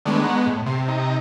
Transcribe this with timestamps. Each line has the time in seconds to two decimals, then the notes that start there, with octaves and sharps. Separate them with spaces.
0.06 D#3 G#3 A3 B3 D4
0.24 F#5 A#5 C#6
0.47 A2
0.66 C3 C6
0.88 D#4 A#5